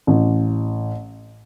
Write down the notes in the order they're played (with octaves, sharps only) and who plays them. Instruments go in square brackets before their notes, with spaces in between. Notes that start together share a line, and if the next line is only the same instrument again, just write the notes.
[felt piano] A1